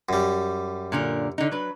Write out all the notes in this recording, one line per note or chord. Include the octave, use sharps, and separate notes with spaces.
F#2 G3
A#2 D3 A#4
D3 D#4
F#3 B4